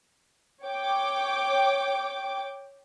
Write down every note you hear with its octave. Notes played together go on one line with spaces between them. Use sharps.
C#5 G5 D6